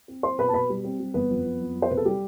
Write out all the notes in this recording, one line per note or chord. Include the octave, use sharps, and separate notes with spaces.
C4
C4 C5 C6
B2 B4 B5
A5
B2 B4 B5
G3
C4
G3
G1 B3 B4
F2
F2
F2
F2
C5
C3 B4
A4
G3 G4